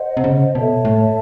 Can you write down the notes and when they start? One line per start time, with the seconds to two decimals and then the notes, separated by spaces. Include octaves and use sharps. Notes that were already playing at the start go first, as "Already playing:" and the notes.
Already playing: C5 D#5 F#5
0.17 C3
0.24 C#3
0.54 B2 A4 C#5 E5 A5
0.85 A2